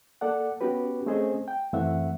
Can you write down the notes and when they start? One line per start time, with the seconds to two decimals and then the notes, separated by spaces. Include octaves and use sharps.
0.21 A#3 A4 D5 F#5
0.61 B3 C#4 F#4 G4 B4
1.06 A3 C4 C#4 G#4 C5 D#5
1.48 G5
1.73 F#2 E3 A3 C4 E5 F#5